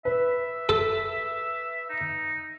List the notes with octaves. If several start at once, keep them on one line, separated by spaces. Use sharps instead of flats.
B4 E5
A4
D#4